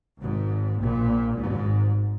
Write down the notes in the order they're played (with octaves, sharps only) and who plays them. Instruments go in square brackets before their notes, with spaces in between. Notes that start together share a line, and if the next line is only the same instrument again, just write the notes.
[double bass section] G#1 G#2
A#1 A#2
G#1 G#2